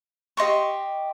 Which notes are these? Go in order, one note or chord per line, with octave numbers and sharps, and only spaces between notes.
G4 D#5 C6 C#6